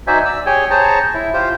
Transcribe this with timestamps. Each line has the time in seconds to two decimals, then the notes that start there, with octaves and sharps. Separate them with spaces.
0.07 D#4 F#4 C5 D5 E5 G#5
0.25 D5 E6
0.46 G4 G#4 C#5 G5 G#5
0.71 G#4 C5 C#5 A5 A#5
1.14 E4
1.34 F4 G4 C5